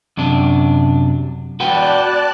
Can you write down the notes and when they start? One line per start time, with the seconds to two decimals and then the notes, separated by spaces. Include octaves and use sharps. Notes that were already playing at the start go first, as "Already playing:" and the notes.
0.17 F#2 C3 D4
1.60 F#4 B4 D5 G5 A5 F#6